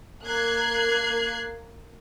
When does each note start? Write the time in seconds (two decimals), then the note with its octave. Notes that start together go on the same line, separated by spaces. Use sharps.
0.24 A#3 F#6 G#6 C7